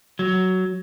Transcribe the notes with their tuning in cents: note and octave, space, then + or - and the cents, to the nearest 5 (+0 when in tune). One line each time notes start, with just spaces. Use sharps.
F#3 +10